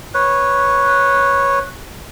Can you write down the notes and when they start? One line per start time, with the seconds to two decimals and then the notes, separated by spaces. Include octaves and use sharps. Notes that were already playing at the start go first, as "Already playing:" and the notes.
0.14 B4 C#5